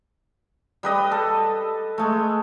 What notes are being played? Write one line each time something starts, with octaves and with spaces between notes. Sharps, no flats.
G3 B4 D#5
A4
G#3 A3